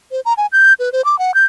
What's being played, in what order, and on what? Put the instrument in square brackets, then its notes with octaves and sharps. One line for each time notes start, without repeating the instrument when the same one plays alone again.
[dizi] C5
A#5
G#5
G6
B4
C5
D6
F#5
G6